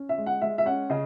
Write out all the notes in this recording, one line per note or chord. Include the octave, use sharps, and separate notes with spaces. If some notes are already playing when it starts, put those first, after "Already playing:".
Already playing: C#4
E5
G#3
F#5
G#3 E5
E5
C#4 F#5
C#3 D#5